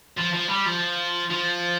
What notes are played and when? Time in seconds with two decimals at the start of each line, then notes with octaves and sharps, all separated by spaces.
0.17 F3
0.33 F3
0.49 G3
0.66 F3
1.30 F3